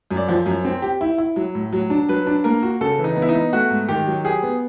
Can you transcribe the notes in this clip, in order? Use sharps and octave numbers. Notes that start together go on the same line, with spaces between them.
F#2
D5
F3
F#2
C4
G4
E4
E4
F#3
A2
F#3
D4
F#3 B4
D4
A#3 A#4
F#4
C#3 A4
E3
D#4
B3
E4
D#4
B3
A3 F#4
G#2
D#3 G4
F#3
G4 G#4
B3